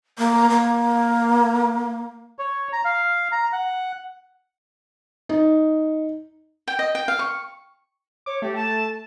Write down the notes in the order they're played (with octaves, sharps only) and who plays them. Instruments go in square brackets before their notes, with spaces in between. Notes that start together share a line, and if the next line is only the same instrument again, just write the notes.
[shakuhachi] A#3
A#3
[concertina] C#5
A#5
F5
A#5
F#5
[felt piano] D#4
[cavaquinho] G5
D#5
G5
F5
C#6
[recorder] C#5 [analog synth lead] D6
[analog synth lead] A3 [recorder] G4
[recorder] A5